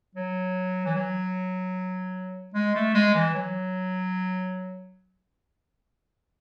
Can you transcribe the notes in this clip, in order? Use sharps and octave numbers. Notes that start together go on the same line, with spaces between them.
F#3
E3
F#3
G#3
A3
G#3
E3
F#3